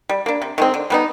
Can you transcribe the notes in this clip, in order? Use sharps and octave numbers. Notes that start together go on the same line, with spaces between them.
G3
A#3 D4
C3
D#3 G#3 C4
D3
G3 B3 D#4